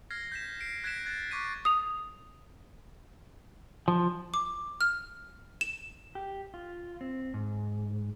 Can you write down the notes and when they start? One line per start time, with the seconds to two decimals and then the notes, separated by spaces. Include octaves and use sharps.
0.10 F6 G#6 A#6 C7
0.32 G6 B6 E7
0.60 C7 D7
0.84 F#6 G#6 A#6 B6 D7 E7
1.06 F#6 G#6 A6
1.31 C#6 D6 F#6 G#6 B6 D#7
1.65 D#6 F7
3.88 F3
4.34 D6
4.81 F6
5.61 E7
6.15 G4
6.54 F4
7.01 C4
7.34 G#2